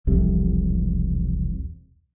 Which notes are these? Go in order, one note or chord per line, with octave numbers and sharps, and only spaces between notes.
E1 C2 F2 C3